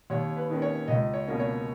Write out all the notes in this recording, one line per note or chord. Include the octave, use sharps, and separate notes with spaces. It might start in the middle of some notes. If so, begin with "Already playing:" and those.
D#2 C#5
B4
D#3 A#3 C#4
C#5
C#2 D#5
C#5
B2 A#3 C#4
C#5